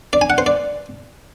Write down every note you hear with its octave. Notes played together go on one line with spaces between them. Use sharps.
D5
G#5
F#5
C5
D5